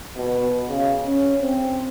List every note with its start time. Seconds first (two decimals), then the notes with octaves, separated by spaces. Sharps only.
0.17 B2
0.69 C#3
1.07 C#4
1.41 C4